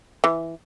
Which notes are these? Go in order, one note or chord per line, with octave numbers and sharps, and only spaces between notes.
E3